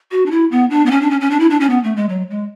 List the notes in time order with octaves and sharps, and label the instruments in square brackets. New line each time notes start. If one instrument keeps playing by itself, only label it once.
[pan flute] F#4
D4
E4
B3
D4
B3
C#4
D4
C#4
C#4
D4
E4
D4
C#4
B3
A3
G#3
F#3
G#3